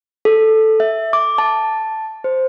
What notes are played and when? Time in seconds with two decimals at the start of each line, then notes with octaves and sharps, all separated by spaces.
0.25 A4
0.80 E5
1.13 D6
1.38 A5
2.24 C5